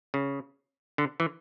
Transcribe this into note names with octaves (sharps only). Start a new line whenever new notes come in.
C#3
D3
E3